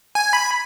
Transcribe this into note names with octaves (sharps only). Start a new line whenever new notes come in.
G#5
B5